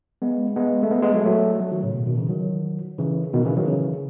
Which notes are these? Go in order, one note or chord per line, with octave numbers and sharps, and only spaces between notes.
G#3 B3
G#3 B3
A3
G#3 B3
G#3 B3
F#3 A3
F#3 A3
F#3 A3
D#3 F#3
A2 C#3
B2
B2 D#3
C#3 E3
D#3 F#3
C#3 E3
B2 D#3
C#3 E3
D#3 F#3
C#3 E3